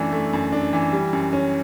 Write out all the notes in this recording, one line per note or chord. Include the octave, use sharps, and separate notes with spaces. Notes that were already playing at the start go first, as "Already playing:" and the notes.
Already playing: F#2 E3 A3 D4
A3
F#2
D4
E3
G3
F#2
C#4